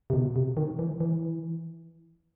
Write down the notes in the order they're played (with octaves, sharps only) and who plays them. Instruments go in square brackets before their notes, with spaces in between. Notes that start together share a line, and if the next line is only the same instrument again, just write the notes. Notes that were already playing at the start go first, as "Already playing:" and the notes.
[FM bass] C3
B2
C3
D#3
E3
E3